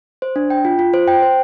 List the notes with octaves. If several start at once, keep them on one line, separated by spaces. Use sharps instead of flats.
C5
D4
G5
F4
F4
C5
G5
C5